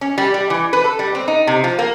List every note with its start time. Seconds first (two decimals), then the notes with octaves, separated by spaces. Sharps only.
0.01 C#4
0.18 G3
0.34 G3
0.50 E3
0.73 B4
0.84 A4
0.99 G3
1.15 C4
1.28 D#4
1.47 C3
1.64 F3
1.79 A#3